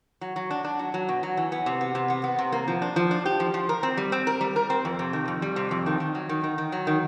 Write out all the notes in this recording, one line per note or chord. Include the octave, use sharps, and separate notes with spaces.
F#3
F#3
D4
D4
F#3
F#3
B2
F#3
E3
B3
C3
B3
C3
B3
B3
C3
A#3
F3
D4
F3
D4
G4
F3
F3
A#4
C4
G3
C4
A#4
G3
A#4
C4
F2
C3
D#3
F2
G3
C3
F2
D#3
D#3
F#3
D#3
D#3
D#3
F#3
D#3